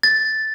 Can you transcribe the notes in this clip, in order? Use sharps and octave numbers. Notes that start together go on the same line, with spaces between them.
A6